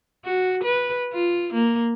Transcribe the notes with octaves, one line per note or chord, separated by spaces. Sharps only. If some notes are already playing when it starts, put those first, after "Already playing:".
F#4
B4
F4
A#3